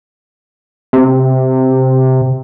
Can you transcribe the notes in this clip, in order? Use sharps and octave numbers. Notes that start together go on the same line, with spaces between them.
C3